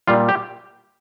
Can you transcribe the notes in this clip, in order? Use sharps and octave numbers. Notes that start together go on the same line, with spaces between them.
A#2 G3 F4
G4